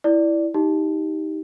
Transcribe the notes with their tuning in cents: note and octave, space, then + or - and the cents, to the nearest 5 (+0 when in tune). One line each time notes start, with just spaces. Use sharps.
E4 +0 D5 +0
D#4 +15 G4 +0